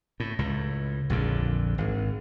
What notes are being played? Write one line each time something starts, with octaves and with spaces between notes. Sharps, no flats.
A2
C#2 A2
A#1 F2 D3
G#1